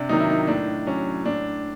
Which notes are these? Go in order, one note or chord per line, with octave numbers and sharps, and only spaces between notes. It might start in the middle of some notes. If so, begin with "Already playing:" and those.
Already playing: C3 D4
D#3 F#3 D#4
E4
D#4
A2 D4
F#3 C#4
A2 D4